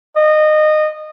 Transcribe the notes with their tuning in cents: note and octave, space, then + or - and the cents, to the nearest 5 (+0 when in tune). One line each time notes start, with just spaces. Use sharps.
D#5 -20